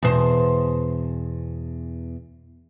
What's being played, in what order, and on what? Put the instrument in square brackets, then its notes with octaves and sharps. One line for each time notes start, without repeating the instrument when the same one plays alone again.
[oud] E2 B2 C5